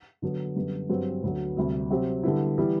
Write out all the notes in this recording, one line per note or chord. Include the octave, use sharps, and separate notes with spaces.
D3 F#3 B3
F#2 D3 G3 B3
G2 F#3 C4 G4 B4
D2 D3 F#3 B3
D2 C3 G3
C3 F#3 C4 G4
D3 G3 B3 E4
E3 G3 B3 E4